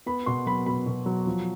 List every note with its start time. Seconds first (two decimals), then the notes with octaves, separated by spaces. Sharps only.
0.06 B3 B5
0.26 B2 C6
0.46 F#3 B5
0.66 B2 B5
0.86 B2
1.06 F#3
1.27 F3